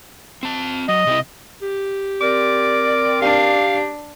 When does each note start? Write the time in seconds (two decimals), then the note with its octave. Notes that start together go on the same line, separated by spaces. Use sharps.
0.43 C4 A5
0.88 F#3 D#5
1.07 C3 C4 E4
1.62 G4
2.21 C4 A#4 D5 D6
3.22 D4 G4 F5